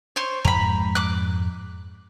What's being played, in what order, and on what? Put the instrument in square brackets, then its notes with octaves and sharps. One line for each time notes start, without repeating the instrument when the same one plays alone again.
[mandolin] C5 C#5
[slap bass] F2 G#2 G#3 [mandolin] A#5 B5
[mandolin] D6 F#6